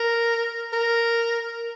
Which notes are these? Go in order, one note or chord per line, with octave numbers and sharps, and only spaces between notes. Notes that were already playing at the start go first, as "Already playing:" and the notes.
Already playing: A#4
A#4